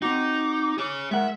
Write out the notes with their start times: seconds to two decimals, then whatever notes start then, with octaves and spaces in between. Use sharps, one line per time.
0.02 C4 D#4 F#4 D6
0.78 G#4 C#5
1.11 G#3 A#4 E5 F#5